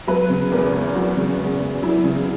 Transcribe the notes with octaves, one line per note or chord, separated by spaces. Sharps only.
F#3 B4
C#3
E2 A#4
E2
F#3 F#4
C#3
E2
E2
F#3 E4
C#3